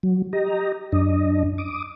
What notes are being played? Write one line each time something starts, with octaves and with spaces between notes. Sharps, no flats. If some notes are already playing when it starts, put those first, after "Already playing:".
F#3
G4 D#5 A#5
F#2 D4 D#5
D6 D#6